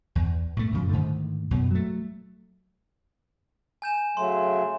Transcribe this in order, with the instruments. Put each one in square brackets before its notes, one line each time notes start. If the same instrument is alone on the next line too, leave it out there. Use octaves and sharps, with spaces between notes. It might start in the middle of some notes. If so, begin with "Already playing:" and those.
[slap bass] E2
A2 A3
F#2 C#3 F3
G#2 D3 D#3 A3
F#2 B2
F#3 A3
[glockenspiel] G#5 G6 E7
[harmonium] C#3 F#3 A3 [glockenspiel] C6